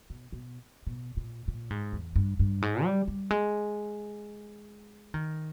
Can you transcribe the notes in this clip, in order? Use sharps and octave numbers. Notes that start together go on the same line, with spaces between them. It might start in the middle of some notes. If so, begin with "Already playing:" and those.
B2
B2
B2
A#2
A#2
G#2
E2
G2
G2
G#2
G3
G3
G#3
D#3